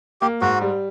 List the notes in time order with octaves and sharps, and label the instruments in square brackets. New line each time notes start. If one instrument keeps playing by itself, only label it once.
[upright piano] A#3 [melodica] G4
[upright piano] G#2 [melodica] F#4
[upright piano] G3